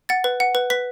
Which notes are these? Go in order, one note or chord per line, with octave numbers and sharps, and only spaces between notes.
F#5 A6
B4
F#5
B4
B4 B6